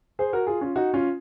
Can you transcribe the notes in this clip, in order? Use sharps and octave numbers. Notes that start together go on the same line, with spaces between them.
G#4 C5
F#4 A#4
F4 G#4
C#4 F4
D#4 F#4
C#4 F4